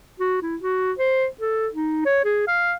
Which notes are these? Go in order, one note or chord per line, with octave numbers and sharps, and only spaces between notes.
F#4
E4
F#4
C5
A4
D#4
C#5
G#4
F5